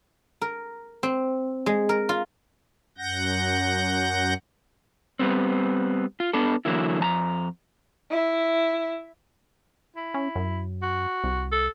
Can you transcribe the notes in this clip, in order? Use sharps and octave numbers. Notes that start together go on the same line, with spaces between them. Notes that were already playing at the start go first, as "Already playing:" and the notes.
A#4
C4
G#3
A#4
F4
F#2 F#5 G6 A#6
G3 B3 C4
F4
B3 D4 A4
D3 E3 F#3 A#3 E4
F2 A5 A#5
E4
E4
C#4
F#2
F#4
C2
A4